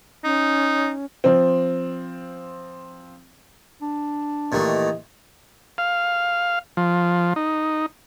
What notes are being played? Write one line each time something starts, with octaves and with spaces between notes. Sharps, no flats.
C#4 D#4
F3 C4
D4
A#2 D#3 E3 A3 G4 D#5
F5
F3
D#4